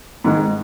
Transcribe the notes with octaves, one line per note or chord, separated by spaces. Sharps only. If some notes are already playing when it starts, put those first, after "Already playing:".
G#2 D#3 G#3